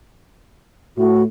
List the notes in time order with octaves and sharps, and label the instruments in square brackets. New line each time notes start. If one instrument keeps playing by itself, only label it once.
[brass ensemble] A2 [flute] F#4